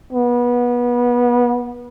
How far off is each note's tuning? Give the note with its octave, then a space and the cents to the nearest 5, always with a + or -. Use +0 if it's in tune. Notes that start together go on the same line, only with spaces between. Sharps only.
B3 -25